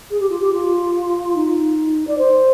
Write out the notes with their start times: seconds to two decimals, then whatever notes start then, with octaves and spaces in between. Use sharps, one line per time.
0.10 G#4
0.20 G4
0.29 F4
0.40 G4
0.52 F4
1.35 D#4
2.07 D5
2.18 C5